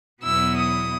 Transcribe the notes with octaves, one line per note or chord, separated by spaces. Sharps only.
E2 B2 F#3 B3 E4 E6
D#6